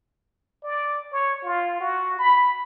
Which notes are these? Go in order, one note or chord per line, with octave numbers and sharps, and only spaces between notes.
D5
C#5
F4
F#4
B5